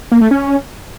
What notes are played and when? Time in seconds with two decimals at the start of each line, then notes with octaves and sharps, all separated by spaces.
0.12 A#3
0.21 A3
0.31 C#4